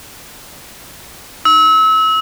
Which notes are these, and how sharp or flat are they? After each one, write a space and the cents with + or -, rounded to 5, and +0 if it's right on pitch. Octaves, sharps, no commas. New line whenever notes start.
E6 -30